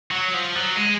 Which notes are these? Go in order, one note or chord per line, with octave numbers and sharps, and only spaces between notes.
F#3
F3
F#3
G#3